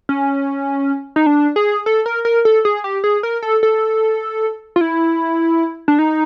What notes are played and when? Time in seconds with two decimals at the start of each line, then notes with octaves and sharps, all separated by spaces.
0.09 C#4
1.16 D#4
1.26 D4
1.56 G#4
1.86 A4
2.06 A#4
2.25 A#4
2.45 A4
2.65 G#4
2.84 G4
3.04 G#4
3.23 A#4
3.42 A4
3.63 A4
4.76 F4
4.81 E4
5.88 D4
5.99 D#4